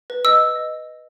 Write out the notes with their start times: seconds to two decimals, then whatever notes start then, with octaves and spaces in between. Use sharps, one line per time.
0.10 B4
0.25 D#5 E6
0.41 B4
0.56 D#5